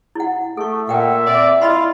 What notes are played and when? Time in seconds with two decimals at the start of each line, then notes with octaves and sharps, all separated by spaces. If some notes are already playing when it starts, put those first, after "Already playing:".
0.15 E4 F#5
0.57 A3 A4 C#6
0.89 A#2 E5 F#5 G5
1.27 C4 D5
1.62 E4 F4 D#5 B5 C6